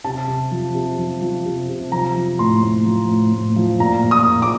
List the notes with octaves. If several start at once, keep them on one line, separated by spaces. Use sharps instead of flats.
C3 A5
C3
F3
C3
F3
F3
C3
C3
F3 A#5
F3
A2 C6
A2
F3
A2
A2
F3
A#2 A#5
A#2
D#6
A#2
D6